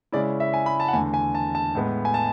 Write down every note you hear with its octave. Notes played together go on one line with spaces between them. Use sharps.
C#3 G#3 C#4 E4 D5
E5
G#5
B5
A5
F#5
E2 D3 A3 G#5
G#5
A5
A5
A2 G#3 B3
G#5
A5